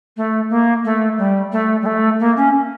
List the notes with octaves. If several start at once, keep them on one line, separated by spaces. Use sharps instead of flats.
A3
A#3
A3
G3
A3
G3
A3
A#3
C#4